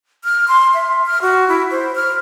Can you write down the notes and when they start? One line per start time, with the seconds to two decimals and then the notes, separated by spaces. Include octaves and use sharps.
0.24 F6
0.48 C6
0.74 E5
1.06 F6
1.22 F#4
1.48 E4
1.71 C5
1.95 F6